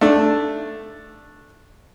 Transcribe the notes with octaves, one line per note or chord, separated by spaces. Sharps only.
A3 D4